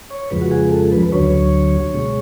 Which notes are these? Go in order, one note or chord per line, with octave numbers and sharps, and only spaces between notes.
C#5
F2 C#3 F3 G#3 B4
F#4
G#4
A4
B4
B4
D2 D3 F#3 C#5
B2 G#3